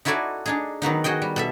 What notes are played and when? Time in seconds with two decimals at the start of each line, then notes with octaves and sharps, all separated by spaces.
0.05 D#4 E4 F#4 A4 D5 G#5
0.46 D4 D#4 G#4
0.82 D#3 F#3 B3 D#4
1.04 F#4 G#4 D#5 G5
1.22 G3
1.36 B2 A4 E5